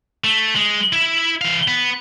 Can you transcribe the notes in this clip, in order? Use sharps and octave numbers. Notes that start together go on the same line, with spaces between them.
A3
G#3
E4 E5
E3 F5
B3